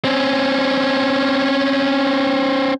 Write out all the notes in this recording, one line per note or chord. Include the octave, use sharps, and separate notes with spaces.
C4 C#4